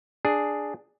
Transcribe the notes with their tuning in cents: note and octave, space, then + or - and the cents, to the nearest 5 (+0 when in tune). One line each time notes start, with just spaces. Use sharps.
D4 +5 G#4 +0